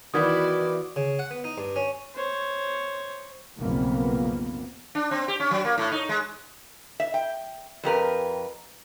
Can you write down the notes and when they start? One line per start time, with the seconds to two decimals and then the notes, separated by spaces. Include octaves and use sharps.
0.14 D#3 E3 B3 E4 F#4 D5 D#6 G#6
0.96 C#3
1.19 F#5
1.31 B3
1.44 D#4
1.58 G2
1.76 C#4
2.15 C5 C#5
3.59 B1 F2 A#2 C#3 A#3 B3
4.95 D4
5.11 C4
5.28 G4
5.40 C#4
5.51 F#3
5.65 A#3
5.78 A2
5.92 D#4
6.09 G#3
7.00 E5
7.14 G5
7.83 F2 G4 A#4 B4